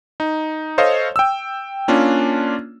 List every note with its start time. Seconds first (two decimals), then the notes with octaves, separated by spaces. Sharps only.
0.20 D#4
0.78 A4 C5 C#5 D#5 F5
1.16 G5 E6
1.88 A#3 C#4 D4 F4